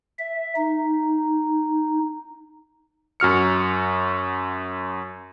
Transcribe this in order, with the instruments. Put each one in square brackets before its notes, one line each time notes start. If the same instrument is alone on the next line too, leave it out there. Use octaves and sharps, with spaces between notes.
[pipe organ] E5
D#4
[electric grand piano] F#2 F#4 F6 C#7